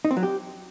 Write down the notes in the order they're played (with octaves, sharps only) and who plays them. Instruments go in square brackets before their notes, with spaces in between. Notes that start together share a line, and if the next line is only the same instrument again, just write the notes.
[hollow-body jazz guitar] D#4
C4
F#3
G4